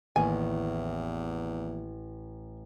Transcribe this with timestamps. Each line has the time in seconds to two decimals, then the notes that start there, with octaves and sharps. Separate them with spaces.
0.16 A1 E2 D#3 A#3 E4 G#5